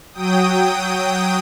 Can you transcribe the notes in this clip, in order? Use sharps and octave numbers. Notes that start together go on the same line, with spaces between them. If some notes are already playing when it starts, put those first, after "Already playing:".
F#3 G5 D#6